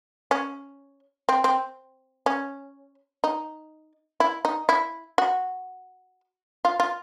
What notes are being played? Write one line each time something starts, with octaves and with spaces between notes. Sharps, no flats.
C#4
C4
C4
C#4
D#4
E4
D#4
E4
F#4
F4
F4